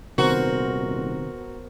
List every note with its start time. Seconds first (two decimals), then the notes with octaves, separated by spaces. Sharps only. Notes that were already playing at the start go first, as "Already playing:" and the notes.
0.18 D#1 C3 D#3 B3 C4 F#4 A#4 C5